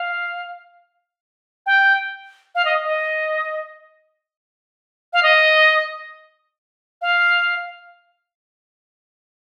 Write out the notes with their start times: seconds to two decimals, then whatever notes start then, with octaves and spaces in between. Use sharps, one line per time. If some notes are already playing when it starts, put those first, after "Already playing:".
Already playing: F5
1.66 G5
2.55 F5
2.65 D#5
2.84 D#5
5.13 F5
5.23 D#5
7.02 F5